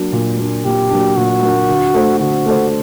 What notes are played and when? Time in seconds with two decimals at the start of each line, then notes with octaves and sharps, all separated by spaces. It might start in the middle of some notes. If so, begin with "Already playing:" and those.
Already playing: F#3 A#3 D4
0.13 A#2
0.38 F#3 A#3 D4
0.64 A#2 G4
0.90 F#3 A#3 D4
1.17 A#2 F#4
1.43 F#3 A#3 D4
1.68 D3
1.94 A3 D4 A4 C5
2.19 D3 F#4
2.46 A3 D4 A4 C5